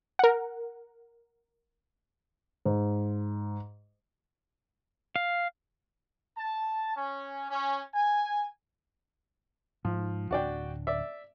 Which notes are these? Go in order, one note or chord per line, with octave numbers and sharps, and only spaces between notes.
A#4 F#5
G#2
F5
A5
C#4
C#4
G#5
G#2 F3
D1 D4 F#4 D5 G5
D5 E5